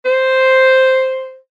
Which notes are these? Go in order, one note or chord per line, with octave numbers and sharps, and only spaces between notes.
C5